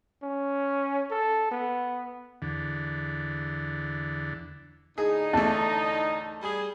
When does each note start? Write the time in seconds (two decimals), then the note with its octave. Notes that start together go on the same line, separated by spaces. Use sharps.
0.23 C#4
1.11 A4
1.51 B3
2.42 E2 D3
4.98 A2 D3 D#4 G#4
5.33 E2 A3 A5
6.42 G3 G#4